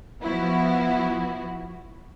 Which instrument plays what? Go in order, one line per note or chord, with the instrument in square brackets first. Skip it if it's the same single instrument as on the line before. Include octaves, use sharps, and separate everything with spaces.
[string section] F3 B3 E4 F#4